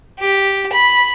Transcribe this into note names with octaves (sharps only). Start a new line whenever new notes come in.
G4
B5